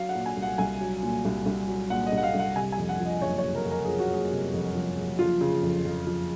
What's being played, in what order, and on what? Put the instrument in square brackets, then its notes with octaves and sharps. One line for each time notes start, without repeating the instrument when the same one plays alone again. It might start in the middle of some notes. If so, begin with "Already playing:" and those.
Already playing: [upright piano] F#3 F5
F#5
A#2
G#5
C2
F#5
C2 G#5
F#3
A#2
C2
C2
F#3
A#2 F#5
D#5
C2
F#5
F5
C2
F#5
C3 G#5
G#5
F2
F#5
F3
D#5
F#1 C#5
C#5
C3
A#4
F2
A#4
F3 G#4
F#4
F#1 G#4
C3
F2
F3
F#1
F3 F4
C#3
F2
F2
F3